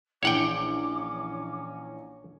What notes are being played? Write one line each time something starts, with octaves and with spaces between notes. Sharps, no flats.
A#1 E3 C#4 C#5 F#5 G5 D6